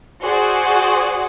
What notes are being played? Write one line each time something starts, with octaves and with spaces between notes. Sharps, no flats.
F#4 G#4 C5 D5 F#5